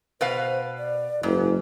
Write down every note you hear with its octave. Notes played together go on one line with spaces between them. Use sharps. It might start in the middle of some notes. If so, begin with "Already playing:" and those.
B2 B4 C5 F5
D5
F#1 G#2 E4